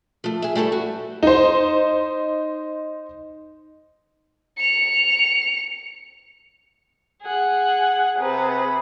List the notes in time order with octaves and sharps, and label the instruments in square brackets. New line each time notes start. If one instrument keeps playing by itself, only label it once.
[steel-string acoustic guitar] F3 A3
G#4 E5
G3 A3 E4 A4 C#5
F#4
[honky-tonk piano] D#4 C5
[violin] C#7 F7
[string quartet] G#4 F#5
C3 G#4 B4